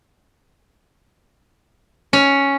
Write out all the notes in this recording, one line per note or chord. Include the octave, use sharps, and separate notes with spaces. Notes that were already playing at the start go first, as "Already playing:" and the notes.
C#4